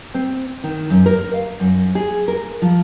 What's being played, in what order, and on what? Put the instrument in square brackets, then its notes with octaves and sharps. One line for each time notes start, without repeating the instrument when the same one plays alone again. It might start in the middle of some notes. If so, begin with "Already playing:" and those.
[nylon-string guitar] C4
D#3
F#2
A#4
F5
F#2
G#4
A#4
F3